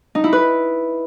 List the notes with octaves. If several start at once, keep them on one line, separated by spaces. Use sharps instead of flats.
D#4
E4
B4